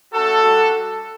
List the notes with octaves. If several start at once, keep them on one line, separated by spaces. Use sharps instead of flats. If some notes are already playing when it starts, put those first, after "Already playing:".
A3 C#4 F#4 A4
G3 D4 F#4